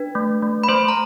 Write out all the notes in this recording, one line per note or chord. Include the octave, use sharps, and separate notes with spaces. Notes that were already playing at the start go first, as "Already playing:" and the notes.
Already playing: D4 B4
A3
A3
B5
A3 C5 C6
A#5